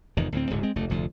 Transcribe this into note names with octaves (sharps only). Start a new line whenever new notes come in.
F1 E2 G#2 D#3
D2 A2 C4
D1 G#2 D3
G#3 C4
F1 D2 A3
F1 D2 D3 F3